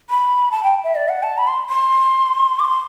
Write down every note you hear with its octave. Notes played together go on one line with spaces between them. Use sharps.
B5
A5
G5
E5
D5
F#5
A5
B5
C6
C6
D6
C6